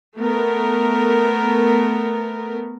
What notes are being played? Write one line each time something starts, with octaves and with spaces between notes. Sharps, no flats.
A3 B3 A#4